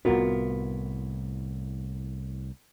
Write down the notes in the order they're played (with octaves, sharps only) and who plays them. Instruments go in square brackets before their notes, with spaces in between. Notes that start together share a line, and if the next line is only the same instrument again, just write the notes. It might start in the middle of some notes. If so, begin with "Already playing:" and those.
[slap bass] C2 A2 [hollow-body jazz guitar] B3 F4 A#4 [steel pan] F#4